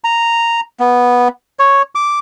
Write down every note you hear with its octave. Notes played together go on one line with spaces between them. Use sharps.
A#5
B3
C#5
D6